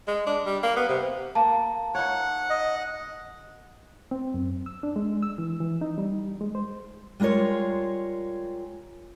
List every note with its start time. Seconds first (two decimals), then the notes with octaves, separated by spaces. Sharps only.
0.08 G#3
0.27 D4
0.46 G3
0.63 A#3
0.76 B3
0.89 C3
1.35 A#3 A5
1.95 D#4 C#5 F#5
2.50 D#5
4.11 C4
4.34 F#2
4.66 E6
4.83 D4
4.96 G#3
5.23 E6
5.38 E3
5.60 E3
5.81 D#4
5.98 G3
6.41 G#3
6.55 C5
7.20 G3 G#3 F4 A#4 C#5